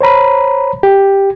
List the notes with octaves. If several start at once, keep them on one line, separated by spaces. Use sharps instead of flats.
C5 C#5 A#5 B5
G4